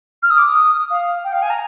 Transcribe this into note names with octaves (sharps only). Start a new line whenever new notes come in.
F6
D#6
D6
D#6
F5
G5
F5
G#5
A#5